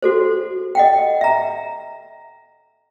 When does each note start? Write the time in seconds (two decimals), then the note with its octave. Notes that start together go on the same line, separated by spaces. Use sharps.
0.03 F#4 A4 C5
0.75 D#5 F#5 G5
1.21 E5 A#5